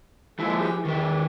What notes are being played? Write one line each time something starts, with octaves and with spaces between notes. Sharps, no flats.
F3 G#3 A#3 E4 A4
G4 G#4 G5
E2 D#3 G4 B4